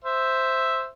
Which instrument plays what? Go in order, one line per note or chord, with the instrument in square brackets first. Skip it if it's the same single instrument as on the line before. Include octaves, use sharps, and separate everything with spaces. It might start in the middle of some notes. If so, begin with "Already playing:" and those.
[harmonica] C5 E5